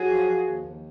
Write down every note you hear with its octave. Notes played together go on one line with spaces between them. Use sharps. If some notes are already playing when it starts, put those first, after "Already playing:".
Already playing: F#3 F#4 G#4
F3
F3
D#2
D#2